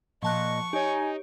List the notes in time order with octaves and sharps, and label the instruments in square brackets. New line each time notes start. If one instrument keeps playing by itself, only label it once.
[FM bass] A#2 [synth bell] F3 A5 F#6 [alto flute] D#5 [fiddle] C#6
[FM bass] D#4 [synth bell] G4 C#5 [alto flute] G#5